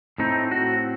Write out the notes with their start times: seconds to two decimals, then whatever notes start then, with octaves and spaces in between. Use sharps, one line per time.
0.18 A2 A3 C4 D#4
0.51 F#4